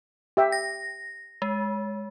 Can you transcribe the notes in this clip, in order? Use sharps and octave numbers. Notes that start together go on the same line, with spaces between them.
G4 E5 G5
A#6
G#3